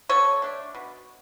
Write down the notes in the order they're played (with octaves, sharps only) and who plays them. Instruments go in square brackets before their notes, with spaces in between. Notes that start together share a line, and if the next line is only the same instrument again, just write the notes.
[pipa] D3 A4 C#5
A3 D4
B2